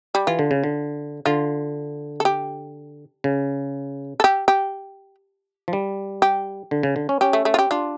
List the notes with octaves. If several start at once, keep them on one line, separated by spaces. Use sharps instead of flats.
G3
E3 F4
D3
C#3
D3
D3 F4
A4
G4
C#3
A4
G4
G4
F3
G3
G4
D3
C#3
D3
C#4
C#4 G4
A3
A3
F4
G4
D4 F4